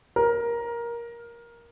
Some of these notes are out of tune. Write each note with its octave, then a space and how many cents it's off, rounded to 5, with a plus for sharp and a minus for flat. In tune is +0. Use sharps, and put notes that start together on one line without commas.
A#4 +15